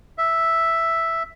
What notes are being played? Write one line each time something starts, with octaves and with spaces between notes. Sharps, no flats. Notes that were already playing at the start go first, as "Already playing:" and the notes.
E5